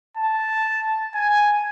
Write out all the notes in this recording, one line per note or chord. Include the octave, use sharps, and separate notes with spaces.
A5
G#5